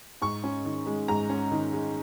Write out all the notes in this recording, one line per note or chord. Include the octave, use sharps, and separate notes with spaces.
G#2 C#6
C#4
D#3
G#3
G#2 A#5
C#4
D#3
G#3